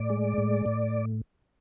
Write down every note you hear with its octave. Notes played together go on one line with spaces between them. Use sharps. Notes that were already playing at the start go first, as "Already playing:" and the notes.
Already playing: A2 D5
G#3
A2
A2